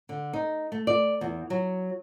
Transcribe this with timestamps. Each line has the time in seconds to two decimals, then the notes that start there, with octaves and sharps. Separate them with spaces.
0.09 D3
0.33 D#4
0.72 A3
0.87 D5
1.21 E2
1.50 F#3